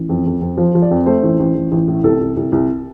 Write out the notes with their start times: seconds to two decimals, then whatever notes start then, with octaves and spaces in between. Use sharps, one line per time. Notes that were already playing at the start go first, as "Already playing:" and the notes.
Already playing: A1
0.09 F2
0.26 F2
0.41 F2
0.57 F3 C5
0.75 F3
0.82 D5
0.91 F2
1.06 A3 C5
1.23 A1
1.40 A1
1.55 A1
1.72 A1
1.88 A2
2.04 C2 A4
2.20 C2
2.37 C2
2.52 C2